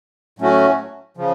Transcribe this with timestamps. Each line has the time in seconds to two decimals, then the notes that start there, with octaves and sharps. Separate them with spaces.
0.39 A2 F#3 A3 C#4 F#4
1.17 C#3 F3